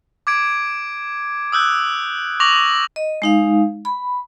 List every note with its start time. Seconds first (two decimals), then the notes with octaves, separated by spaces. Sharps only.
0.27 D6 G#6 D7
1.52 D#6 E6 F#6 G6
2.40 C#6 D6 A#6 F7 F#7
2.96 D#5
3.22 G#3 D#4 F5
3.85 B5